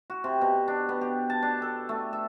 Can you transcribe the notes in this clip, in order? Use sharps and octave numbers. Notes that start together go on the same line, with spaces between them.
F#4
C3
B2
D4
B3
G4
A5
D4
A4
A3
E5